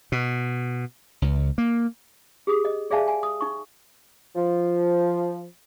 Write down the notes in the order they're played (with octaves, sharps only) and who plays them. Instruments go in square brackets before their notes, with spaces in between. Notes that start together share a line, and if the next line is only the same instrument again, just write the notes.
[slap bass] B2
C#2
A#3
[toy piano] G4 G#4 D#6
D#5
G#4 D5 E5 F5 G#5 A5
G#5
D#6
D#4 C#6
[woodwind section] F3